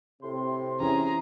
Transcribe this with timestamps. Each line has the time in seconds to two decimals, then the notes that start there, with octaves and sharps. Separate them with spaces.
0.22 A2 C3 C4 C6
0.80 E3 C#4 G#4 A#5